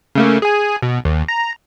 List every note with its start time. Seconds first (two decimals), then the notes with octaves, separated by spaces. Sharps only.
0.15 C#3 A3 A#3
0.42 G#4 G#5
0.82 B2
1.05 D#2
1.28 A#5